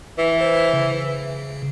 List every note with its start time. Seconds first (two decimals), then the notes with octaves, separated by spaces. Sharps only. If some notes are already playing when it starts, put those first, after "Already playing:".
0.18 E3
0.41 C5
0.73 C#3